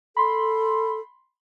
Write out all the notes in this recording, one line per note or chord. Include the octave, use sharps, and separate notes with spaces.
A4 B5 C6